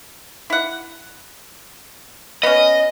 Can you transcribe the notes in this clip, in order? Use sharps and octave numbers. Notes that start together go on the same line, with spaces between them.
E4 F#5
B3 C#4 D#5